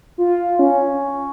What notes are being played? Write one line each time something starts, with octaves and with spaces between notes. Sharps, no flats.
F4
C#4